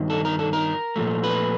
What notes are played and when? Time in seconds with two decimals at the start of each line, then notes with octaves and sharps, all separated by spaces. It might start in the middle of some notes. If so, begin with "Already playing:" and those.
Already playing: G2 D#3
0.10 A4
0.25 A#4
0.39 A4
0.53 A#4
0.96 A#2 F3 A3
1.24 B4